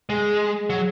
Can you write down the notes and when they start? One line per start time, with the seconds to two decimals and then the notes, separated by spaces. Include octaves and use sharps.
0.10 G#3 G#4
0.70 F#3